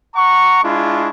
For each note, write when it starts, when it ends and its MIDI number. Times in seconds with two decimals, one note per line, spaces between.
0.15 0.63 78
0.15 0.63 82
0.15 0.63 85
0.63 1.08 56
0.63 1.08 62
0.63 1.08 64
0.63 1.08 65
0.63 1.08 85